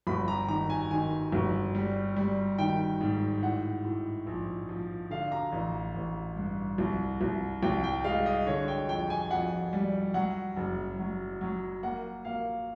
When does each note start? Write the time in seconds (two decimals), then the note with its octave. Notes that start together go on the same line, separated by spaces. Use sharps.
0.07 G1 B5
0.28 A#5
0.48 D#3 A#5
0.70 G#5
0.91 D#3 G#5
1.32 G1
1.75 G3
2.16 G3
2.58 D#3 G5
3.01 G#2
3.43 A2 F#5
3.85 A2
4.26 A#1
4.69 F3
5.11 D3 F5
5.32 A#5
5.52 A1
5.95 A1
6.36 G2
6.78 C2
7.21 C2
7.62 C2 G5
7.84 G5
8.04 G#3 F5
8.26 D#5
8.47 D3 C#5
8.68 G5
8.89 F2 G5
9.10 G#5
9.31 F2 F#5
9.73 G3
10.14 F#3 F#5
10.57 F#1
10.99 F#3
11.41 F#3
11.83 A#3 F#5
12.25 A#3 F5